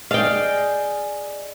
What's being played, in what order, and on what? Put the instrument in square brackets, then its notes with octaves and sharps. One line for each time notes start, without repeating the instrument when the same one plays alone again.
[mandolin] G#4 D5 D#5 [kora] F5 G5